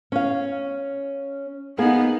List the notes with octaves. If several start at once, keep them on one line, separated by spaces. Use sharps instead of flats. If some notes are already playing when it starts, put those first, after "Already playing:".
C#4 F5
A#3 B3 D#4 G#4